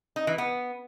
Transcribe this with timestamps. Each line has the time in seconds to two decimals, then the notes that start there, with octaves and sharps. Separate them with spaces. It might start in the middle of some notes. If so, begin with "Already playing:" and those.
0.16 D#4
0.27 E3
0.38 B3